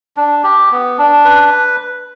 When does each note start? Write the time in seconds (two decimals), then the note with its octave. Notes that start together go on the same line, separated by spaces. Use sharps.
0.17 D4
0.44 G4
0.72 B3
0.98 D4
1.25 B4